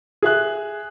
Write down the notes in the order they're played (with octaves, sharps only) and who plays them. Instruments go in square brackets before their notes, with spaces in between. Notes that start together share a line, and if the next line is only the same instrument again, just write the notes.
[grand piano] G#4 E5 F#6